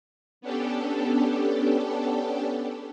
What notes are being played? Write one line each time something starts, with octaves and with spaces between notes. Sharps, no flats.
B3 C#4 D4 G4 A4